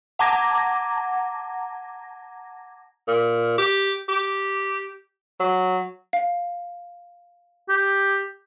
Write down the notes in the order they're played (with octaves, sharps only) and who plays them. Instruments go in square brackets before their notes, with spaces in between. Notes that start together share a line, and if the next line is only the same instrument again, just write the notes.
[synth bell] F#5 A5 A#5 D6 G#6 A#6
[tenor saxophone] A#2
G4
G4
F#3
[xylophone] F5
[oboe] G4